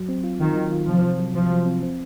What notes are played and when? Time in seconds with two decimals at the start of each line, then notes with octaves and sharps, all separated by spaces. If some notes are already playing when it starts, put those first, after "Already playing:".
Already playing: F#3
0.09 C4
0.24 F4
0.40 D#3 F4
0.55 F#3
0.72 F4
0.88 C3 F3
1.02 C3
1.19 F#3
1.34 C3 F3
1.50 F#3
1.66 C4
1.82 C4